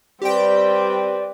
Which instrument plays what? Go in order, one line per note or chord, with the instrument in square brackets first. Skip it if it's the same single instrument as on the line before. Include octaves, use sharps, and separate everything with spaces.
[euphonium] G3 [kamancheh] C4 B4 [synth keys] G4 G5 [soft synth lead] D5